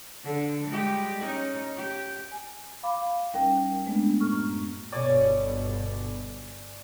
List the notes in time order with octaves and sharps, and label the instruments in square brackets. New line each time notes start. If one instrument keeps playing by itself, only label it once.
[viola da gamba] D3
G3 G#3 G4
C#4 D#4
G4
[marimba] G#5
F5 B5 D6
D#2 G3 C#4 A#4 G5
G#3 A3 B3 D4
A2 C#6 F6
F#2
[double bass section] G1 B2 [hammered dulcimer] C#5 D5 G#5